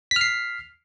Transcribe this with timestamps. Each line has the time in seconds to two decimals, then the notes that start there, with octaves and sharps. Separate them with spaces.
0.11 B6
0.16 F6
0.21 C7